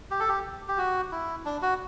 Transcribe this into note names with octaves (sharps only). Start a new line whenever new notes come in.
G4
A4
G4
G4
F#4
E4
D4
F#4